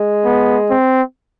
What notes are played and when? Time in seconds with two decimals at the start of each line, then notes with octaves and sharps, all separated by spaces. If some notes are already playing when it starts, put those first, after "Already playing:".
Already playing: G#3
0.25 B3
0.70 C4